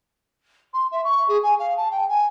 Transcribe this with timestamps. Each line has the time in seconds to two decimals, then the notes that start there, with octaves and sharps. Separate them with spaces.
0.73 C6
0.91 E5
1.04 C#6
1.28 G#4
1.42 G#5
1.59 F5
1.76 A5
1.91 G5
2.08 G#5